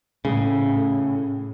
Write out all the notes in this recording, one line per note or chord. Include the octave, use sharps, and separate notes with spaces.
A2 C#3